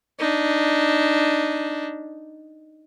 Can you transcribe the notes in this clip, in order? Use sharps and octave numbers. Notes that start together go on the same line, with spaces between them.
D4 D#4